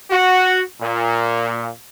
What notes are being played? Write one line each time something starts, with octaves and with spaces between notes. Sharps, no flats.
F#4
A#2